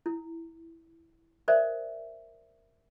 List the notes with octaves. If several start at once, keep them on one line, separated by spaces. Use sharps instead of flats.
E4
A#4 C5 D5 E5